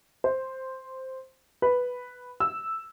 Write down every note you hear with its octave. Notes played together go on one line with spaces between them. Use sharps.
C5
B4
E6